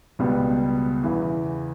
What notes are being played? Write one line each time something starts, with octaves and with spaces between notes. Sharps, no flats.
C#2 B2 G3 B3
E2 C#3 E3